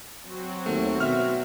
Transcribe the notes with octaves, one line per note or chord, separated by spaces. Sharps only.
F#3 C4 F#4
D#2 A3
B2 E5 F6